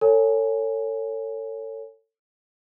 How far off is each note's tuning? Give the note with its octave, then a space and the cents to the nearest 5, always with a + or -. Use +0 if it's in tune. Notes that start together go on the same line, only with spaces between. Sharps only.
A4 +30 C#5 +0 G#5 +0